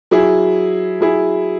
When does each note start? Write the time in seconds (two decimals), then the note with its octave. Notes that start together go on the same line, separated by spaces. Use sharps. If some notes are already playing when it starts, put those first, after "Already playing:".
0.11 F#3 E4 G#4
1.00 F#3 E4 G#4